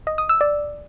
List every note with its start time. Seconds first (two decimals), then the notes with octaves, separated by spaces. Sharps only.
0.07 D#5
0.18 D#6
0.29 E6
0.41 D5